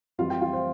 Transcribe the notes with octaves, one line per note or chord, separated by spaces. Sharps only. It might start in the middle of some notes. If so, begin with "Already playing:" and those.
F2 E3 G3 F4 F5
G4 G5
F4 F5
C5